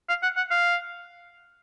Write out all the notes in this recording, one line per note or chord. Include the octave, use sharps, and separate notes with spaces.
F5
F#5
F#5
F5